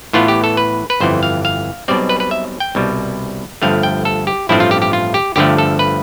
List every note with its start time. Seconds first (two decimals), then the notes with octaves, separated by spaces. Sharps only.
0.13 A2 E3 B3 F4
0.28 G4
0.44 A4
0.57 B4
0.90 B4
1.00 G1 F2 E3 C5
1.23 F5
1.45 F5
1.88 B1 B2 G3 C4 D5
2.09 B4
2.20 B4
2.31 E5
2.60 G5
2.75 C2 B2 G3
3.62 G1 G2 F3 A3 F5
3.83 G5
4.05 A4
4.27 G4
4.49 A1 G2 F3 A3 C4 E4
4.60 F4
4.71 G4
4.82 G4
4.93 F4
5.14 G4
5.36 G1 G2 D3 F3 A3 G4
5.58 A4
5.79 B4